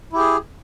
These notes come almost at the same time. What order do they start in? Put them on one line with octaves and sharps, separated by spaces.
E4 G4 G#4